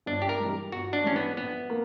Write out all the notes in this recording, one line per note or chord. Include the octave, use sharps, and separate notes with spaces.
G1 D4
G4
A#4
G2 E3 G3
G1 F#4
D4
G2 E3 G3 C#4
B3
A#1 B3
A#3